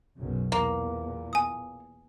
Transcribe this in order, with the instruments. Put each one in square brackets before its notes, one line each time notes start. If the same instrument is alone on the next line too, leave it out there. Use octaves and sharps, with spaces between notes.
[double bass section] B1 F#2 C#3
[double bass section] E2 A#2 [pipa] A#3
[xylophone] G#5 D#6